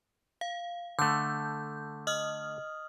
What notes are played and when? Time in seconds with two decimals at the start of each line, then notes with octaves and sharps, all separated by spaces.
0.41 F5
0.99 D3 A3 G6
2.07 D#5 D#6 F6